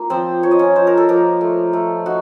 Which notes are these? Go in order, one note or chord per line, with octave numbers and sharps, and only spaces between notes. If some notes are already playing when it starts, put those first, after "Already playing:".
Already playing: A#3 F4
F3 C4 C5
F3 C#5
D#5
C#4 C#5
F3 C5
A#4
A4
F3 A#3 A#4
A3
A3
D#4 F#4